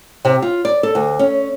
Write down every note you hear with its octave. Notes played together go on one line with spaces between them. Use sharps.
C3
F4
D5
A4
D2
C#4